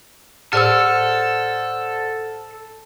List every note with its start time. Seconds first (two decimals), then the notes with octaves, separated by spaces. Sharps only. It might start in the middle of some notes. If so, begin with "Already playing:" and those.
0.53 A2 A4 C5 D5 F#5 E6 F6